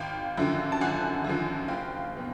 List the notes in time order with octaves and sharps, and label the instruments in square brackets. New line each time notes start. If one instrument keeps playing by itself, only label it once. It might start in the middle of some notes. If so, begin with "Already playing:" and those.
Already playing: [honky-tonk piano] G#1 F5 G5
F#2 D3 F3
A5
G#1 F#5 G#5
F#2 D3 F3
F#1 F5 G5
B2